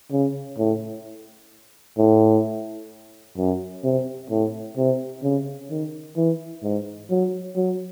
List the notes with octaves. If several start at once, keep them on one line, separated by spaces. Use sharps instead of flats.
C#3
A2
A2
F#2
C3
A2
C3
C#3
D#3
E3
G#2
F#3
F#3